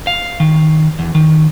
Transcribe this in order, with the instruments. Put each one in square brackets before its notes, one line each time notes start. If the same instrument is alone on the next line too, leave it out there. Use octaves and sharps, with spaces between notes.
[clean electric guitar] F5
D#3
E2
D#3